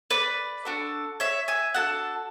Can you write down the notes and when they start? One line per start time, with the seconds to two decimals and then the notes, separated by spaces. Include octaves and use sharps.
0.11 B4 D5
0.65 D4 F#4 A4
1.20 C#5 E5
1.48 E5 G#5
1.74 D4 F#4 A4 F#5 A5